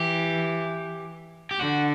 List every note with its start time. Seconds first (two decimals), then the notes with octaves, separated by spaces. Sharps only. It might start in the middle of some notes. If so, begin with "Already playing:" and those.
Already playing: E3 G4
1.51 G4
1.59 D3 F#4